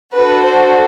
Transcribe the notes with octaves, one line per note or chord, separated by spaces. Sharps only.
D4 F#4 A4 B4
C5